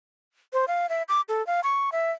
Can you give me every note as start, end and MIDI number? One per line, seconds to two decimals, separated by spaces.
0.53 0.65 72
0.68 0.89 77
0.89 1.03 76
1.09 1.21 86
1.29 1.45 69
1.47 1.60 77
1.63 1.90 85
1.92 2.11 76